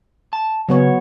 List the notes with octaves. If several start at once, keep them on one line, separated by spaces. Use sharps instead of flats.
A5
C#3 F#3 B3 C#5